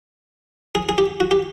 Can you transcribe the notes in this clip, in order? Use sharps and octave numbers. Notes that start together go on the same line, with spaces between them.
G#4
G#4
G4
F#4
G4